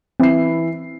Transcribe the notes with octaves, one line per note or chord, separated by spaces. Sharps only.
E3 C4 E4 C7